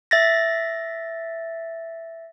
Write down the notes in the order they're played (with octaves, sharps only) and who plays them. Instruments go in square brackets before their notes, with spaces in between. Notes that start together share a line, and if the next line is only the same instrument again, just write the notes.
[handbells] E5 A6 A#6